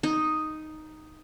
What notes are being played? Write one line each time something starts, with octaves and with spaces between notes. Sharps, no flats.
D#4